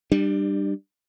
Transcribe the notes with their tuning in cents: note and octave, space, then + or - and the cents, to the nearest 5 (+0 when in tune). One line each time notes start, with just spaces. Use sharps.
G3 +0 D4 +30